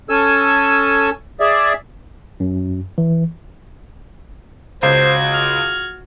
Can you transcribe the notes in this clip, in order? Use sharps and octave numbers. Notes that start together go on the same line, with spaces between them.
C#4 A4 G#5 E6
G#4 D5 E5
F#2
E3
C#2 F#4 C5 G#6
F6